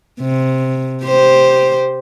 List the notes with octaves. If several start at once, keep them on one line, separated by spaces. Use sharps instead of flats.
C3
G4 C5